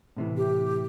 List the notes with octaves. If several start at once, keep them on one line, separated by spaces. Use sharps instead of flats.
A2 C3 E3
G4